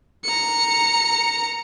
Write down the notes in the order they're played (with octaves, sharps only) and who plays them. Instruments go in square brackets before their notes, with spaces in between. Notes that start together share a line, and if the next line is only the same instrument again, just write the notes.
[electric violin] A#5 C#7